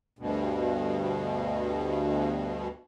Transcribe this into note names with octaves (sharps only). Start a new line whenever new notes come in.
D2 G2 B2